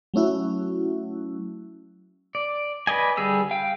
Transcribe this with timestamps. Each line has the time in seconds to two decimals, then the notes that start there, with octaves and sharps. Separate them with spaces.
0.14 F#3 A3 C#4 E4 F#4
2.35 D5
2.87 B4 D5 D#5 G#5
3.17 D3 G3 G#4 E6
3.51 F5 G5